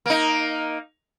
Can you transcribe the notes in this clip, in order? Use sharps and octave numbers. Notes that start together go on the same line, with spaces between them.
A#3 D#4